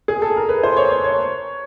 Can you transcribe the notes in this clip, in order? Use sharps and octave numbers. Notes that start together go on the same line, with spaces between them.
G#4
A4
A#4
B4
C5
C#5
C#5
C#5